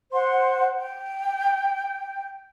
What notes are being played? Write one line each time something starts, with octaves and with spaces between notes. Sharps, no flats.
C5 F#5 C6
G5